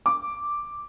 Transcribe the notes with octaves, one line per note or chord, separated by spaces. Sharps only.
D6